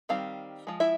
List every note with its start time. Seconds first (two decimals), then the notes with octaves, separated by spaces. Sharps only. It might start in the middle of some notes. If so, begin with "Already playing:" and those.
0.09 D#3 G3 C4 F5
0.67 F3 G#3
0.80 E4 E5